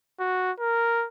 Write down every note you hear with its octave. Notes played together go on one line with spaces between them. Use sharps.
F#4
A#4